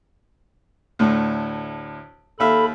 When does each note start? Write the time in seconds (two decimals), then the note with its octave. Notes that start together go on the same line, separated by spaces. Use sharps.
0.99 D2 A2
2.40 D#2 A4 E5 F5 B5